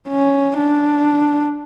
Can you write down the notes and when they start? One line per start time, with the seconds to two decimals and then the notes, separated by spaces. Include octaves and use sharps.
0.09 C#4
0.57 D4